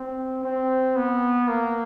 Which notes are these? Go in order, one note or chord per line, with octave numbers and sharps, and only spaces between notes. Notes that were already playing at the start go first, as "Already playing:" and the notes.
Already playing: C4
C4
B3
A#3